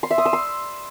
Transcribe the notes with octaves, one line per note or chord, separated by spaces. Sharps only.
C6
E5
D#6
E6
C6